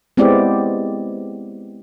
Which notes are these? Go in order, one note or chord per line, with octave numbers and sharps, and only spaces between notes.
G#3 B3 C4 E4 G4 D5